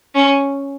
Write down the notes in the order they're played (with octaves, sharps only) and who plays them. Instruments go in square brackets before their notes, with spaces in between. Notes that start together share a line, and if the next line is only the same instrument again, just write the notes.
[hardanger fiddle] C#4